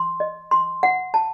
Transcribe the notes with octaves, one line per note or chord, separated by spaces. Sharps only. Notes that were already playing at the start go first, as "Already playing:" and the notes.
Already playing: C6
D#5
C6
F#5
A5